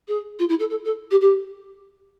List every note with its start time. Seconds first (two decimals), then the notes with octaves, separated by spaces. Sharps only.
0.08 G#4
0.39 F4
0.49 E4
0.60 A4
0.70 A4
0.85 A4
1.11 G4
1.21 G4